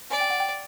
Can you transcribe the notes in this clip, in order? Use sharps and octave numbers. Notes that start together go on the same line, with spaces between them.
D5 G#5
G5
F#5
G5